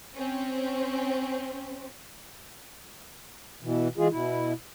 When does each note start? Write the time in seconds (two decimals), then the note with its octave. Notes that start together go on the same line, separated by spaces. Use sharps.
0.15 C4 C#4
3.63 B2 E3
3.98 E3 G#3 F4 G#4
4.11 B2 E4